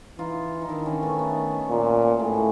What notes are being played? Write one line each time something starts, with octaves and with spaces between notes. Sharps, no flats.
E3 D#4 F4
D#4
D#3 D4 E4
C#4 D#4
A3 B3
A3 B3
A#2
A2 G#3